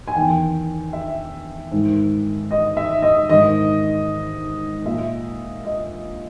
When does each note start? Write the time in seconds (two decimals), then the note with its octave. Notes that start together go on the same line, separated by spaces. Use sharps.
0.07 G#5
0.16 E2 D#3 G5
0.93 E5
1.72 G#2 D#3
2.51 D#5
2.77 E5
3.02 D#5
3.29 G#2 D#3 D#5
4.86 A#2 E5
5.65 D#5